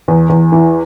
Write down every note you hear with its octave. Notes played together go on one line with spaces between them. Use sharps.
E2
E2
E3